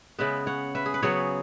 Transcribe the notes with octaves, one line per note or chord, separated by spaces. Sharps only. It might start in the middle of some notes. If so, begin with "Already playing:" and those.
C#3 G#3 B3 B4 E5
C#5 F#5
B4 E5
G#4
B4
C#3 F#3 B3 G#4 C#5